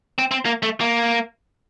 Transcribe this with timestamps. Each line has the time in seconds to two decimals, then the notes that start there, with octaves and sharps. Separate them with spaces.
0.18 C4
0.31 C4
0.45 A#3
0.63 A3
0.81 A#3